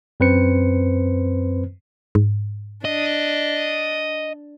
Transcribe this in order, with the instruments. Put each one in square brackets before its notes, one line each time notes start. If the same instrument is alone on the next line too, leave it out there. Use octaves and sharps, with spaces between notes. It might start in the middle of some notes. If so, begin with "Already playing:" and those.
[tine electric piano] F#2 C4 B4 C5 C#7
[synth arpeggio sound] G#2
[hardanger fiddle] D4 [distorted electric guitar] D#5